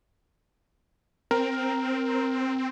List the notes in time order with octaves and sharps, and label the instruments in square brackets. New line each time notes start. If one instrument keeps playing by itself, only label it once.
[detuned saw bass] C4 [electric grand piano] A#4